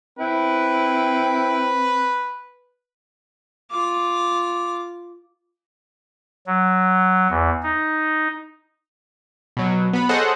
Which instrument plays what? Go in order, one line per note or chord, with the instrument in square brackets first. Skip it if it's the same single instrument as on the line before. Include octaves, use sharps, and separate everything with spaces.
[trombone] C4 [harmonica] E4 G5 [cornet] B4
[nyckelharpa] F4 D6
[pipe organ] F#3
E2
D#4
[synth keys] B2 F#3
B3 B5
G#4 A4 C5 C#5 D#5 F#5